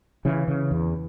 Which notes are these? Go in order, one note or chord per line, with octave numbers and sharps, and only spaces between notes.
C#3 E3
C#3
E2